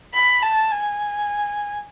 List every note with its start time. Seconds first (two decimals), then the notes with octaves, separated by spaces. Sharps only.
0.14 B5
0.43 A5
0.71 G#5